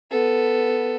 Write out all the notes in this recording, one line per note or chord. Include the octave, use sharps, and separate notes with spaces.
B3 A4